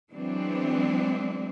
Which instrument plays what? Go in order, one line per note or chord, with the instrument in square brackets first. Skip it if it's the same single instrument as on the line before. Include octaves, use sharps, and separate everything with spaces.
[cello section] E3 F#3 G#3 B3 C4 D4